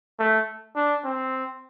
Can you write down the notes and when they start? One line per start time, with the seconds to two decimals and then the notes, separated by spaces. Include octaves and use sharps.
0.19 A3
0.76 D4
1.05 C4